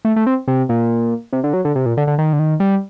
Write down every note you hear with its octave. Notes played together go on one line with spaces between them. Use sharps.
A3
A3
C4
C3
A#2
C3
D3
F#3
D3
C3
A#2
D3
D3
D#3
D3
D#3
G3